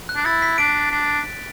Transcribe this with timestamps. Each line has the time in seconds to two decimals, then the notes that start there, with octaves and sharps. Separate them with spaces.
0.09 F#6
0.15 D4
0.25 E4 A6
0.42 B6
0.58 D4 D7
0.91 D4